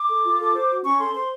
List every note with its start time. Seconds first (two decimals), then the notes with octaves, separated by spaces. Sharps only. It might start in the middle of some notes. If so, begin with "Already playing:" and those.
Already playing: D6
0.10 A4
0.24 F4
0.39 A4
0.55 C5
0.70 F#4
0.85 C#4 C#6
0.99 A4 C6
1.15 C5 C6